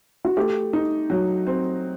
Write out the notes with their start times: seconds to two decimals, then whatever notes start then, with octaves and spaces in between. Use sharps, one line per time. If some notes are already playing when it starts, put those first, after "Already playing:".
0.25 F#4
0.37 A3 G4
0.73 D#4
1.10 F#3
1.47 C4